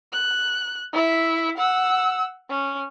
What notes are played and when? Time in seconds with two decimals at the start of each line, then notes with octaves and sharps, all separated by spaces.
0.12 F#6
0.93 E4 E5
1.57 F#5 E6
2.50 C#4